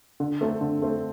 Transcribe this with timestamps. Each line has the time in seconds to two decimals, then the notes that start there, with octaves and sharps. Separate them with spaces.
0.20 D3
0.41 A3 C4 A4
0.61 D3
0.82 A3 C4 A4